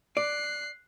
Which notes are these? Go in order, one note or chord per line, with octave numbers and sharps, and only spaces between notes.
D5 F#6 C7